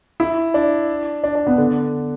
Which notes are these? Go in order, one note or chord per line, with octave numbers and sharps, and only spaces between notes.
E4
D4
D4
D4
B3
D3